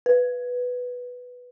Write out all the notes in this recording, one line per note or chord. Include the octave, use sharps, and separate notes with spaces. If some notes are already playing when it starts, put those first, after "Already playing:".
B4